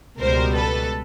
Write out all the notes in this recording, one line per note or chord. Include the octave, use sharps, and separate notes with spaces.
C#2 B2 G3 B3 A#4 C5
A4 B4